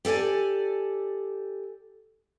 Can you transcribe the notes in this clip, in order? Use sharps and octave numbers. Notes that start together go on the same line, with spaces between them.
G4 A4 D5 G#5